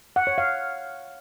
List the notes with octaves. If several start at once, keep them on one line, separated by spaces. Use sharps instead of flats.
F#5
C#5
F5